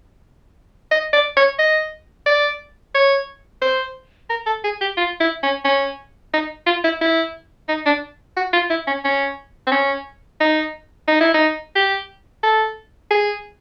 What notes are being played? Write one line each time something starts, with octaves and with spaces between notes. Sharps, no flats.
D#5
D5
C#5
D#5
D5
C#5
C5
A#4
A4
G#4
G4
F4
E4
C#4
C#4
D#4
F4
E4
E4
D#4
D4
F#4
F4
E4
C#4
C#4
C4
C#4
D#4
D#4
E4
D#4
G4
A4
G#4